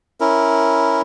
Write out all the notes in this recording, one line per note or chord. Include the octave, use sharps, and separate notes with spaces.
C#4 E4 A#4